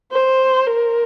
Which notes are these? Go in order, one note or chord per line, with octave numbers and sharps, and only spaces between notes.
C5
A#4